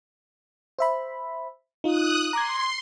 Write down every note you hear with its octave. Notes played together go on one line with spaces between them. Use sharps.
C5 E5 B5
D#4 F4 D#6 F#6
A#5 C6 D6 G#6